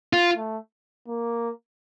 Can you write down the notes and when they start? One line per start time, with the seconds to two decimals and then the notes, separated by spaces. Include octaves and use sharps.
0.13 F4
0.37 A3
1.08 A#3